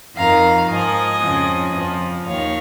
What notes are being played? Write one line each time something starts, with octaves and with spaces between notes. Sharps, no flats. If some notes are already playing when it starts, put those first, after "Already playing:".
F2 D#3 F5 A#5
G#2 F3 D#5 G#5
F2 C#3 F3
F2 F3
D#2 D#3 C#5 F5